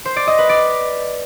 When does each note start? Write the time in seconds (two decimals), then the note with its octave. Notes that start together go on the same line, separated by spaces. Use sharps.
0.05 C5
0.16 D5
0.27 D#5
0.38 B4
0.49 D5